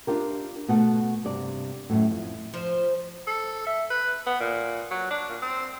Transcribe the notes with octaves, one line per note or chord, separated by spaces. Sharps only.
D4 F4 G4 A#4
B2 A3 F#5 A5
G2 C3 D5
F#2 A2
F2
F3
A4
E5
B4
B3
A#2
F#3
D4
A#2
C4